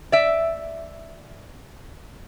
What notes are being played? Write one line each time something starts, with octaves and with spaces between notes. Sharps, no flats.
D5 E5